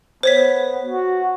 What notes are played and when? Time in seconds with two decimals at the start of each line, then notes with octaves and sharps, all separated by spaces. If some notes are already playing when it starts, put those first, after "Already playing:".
0.23 B3 C5 C#5 B6
0.86 F#4